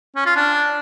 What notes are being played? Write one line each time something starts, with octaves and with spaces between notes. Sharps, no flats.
C#4
F4
D4